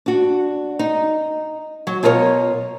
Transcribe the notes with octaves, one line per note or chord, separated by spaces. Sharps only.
D4 F#4
D#4
F#3
B2 F4 A#4 B4 C#5